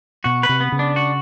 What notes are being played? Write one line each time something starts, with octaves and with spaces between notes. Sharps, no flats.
B2 F#4
B4
C3
B3
C#3
D4
F#4